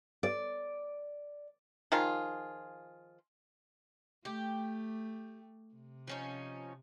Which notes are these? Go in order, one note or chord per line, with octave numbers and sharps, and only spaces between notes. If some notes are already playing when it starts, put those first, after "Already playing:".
D5
D#3 F3 F4 G#4
A3 G4
C3
F3 C#4 D#4